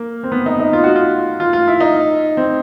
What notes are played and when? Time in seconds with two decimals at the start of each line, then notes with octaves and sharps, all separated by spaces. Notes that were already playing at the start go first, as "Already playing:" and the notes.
Already playing: A#3
0.23 C4
0.32 B3
0.46 D#4
0.60 D#4
0.73 F4
0.84 F#4
0.95 F4
1.40 F4
1.53 F4
1.68 E4
1.80 D#4
2.37 C4